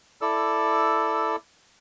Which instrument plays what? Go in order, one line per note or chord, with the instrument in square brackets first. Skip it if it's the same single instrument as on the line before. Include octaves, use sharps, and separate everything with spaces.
[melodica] E4 A4 D5 E6